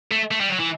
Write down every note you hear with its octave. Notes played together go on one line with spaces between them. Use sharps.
A3
A3
G3
F#3
E3